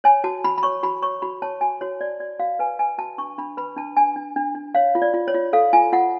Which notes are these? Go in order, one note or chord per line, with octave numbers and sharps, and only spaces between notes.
C#5 G#5
F#4 A5
F#4 B5
B5
C#5 C#6
F#4 B5
C#5 C#6
F#4 B5
C#5 A5
F#4 G#5
F#4 C#5
F#4 D5
F#4 D5
F#4 F5
B4 G#5
B4 G#5
F#4 A5
D4 C#6
D4 B5
B4 B5
D4 A5
D4 G#5
D4
D4
D4
C#5 F5
F4
D5
F4
C#5
F4
A4 F5
F4 G#5
F4 F#5